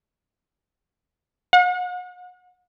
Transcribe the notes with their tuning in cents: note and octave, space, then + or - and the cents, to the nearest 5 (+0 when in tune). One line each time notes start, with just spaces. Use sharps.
F#5 -40